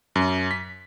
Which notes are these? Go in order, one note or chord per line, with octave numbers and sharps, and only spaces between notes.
F#2
B6